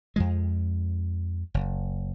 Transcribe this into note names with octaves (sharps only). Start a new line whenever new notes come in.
F2 F3 G#3
F#1